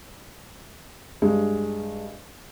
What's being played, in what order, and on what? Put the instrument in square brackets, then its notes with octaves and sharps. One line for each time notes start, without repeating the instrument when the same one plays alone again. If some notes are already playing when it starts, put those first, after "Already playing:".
[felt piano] G2 G#3